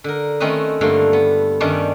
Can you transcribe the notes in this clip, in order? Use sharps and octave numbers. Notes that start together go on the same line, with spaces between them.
D3 A#4
D#3 A3 C4 C#4 B4 D#5
G2 D3 A3 A#3 F4
B3
G2 D#3 G3 C#4 D4 E5